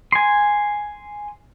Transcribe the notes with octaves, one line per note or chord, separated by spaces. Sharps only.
G#5 C6